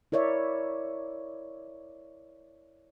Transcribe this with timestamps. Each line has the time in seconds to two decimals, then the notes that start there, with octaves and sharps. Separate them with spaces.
0.12 E4 A#4 C#5 D5 E5